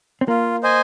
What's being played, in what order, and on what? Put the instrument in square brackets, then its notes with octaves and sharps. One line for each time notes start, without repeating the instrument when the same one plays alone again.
[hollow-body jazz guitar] C4
[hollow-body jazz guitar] A#3 [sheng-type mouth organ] F4
[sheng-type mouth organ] C5 D#5 G#5